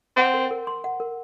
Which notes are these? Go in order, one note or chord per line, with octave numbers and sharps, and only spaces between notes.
C4 F#5
A#4
A#4
C6
F#5
A#4